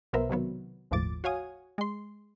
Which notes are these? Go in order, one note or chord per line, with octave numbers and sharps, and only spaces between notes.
B1 B2 B3 A#4 C5 E5
C3 D#3 F#3 B3
G1 D#2 A2 F3 D6 A6
F#4 C#5 F5 G#5 D#6
G#3 C6